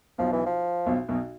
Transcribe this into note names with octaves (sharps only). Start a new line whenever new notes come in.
B1 B2 F3
E3
F3
B1 B2
B1 B2